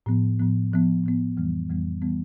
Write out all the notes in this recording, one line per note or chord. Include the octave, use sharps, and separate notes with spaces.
A2 F3 B3
A2 F3 B3
A2 F3 B3
A2 F3 B3
F2 E3 G3 B3
F2 E3 G3 B3
E3 G3 B3